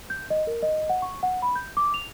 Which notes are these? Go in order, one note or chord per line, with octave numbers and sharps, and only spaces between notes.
G6
D#5
A#4
D#5
F#5
C#6
F#5
B5
G6
D6
F7